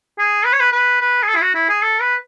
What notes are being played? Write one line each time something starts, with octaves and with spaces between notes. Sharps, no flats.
G#4
B4
C#5
B4
B4
B4
G#4
A4
E4
F#4
E4
G#4
A4
B4